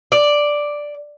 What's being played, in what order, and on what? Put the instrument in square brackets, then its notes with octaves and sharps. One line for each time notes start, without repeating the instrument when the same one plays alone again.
[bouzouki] D5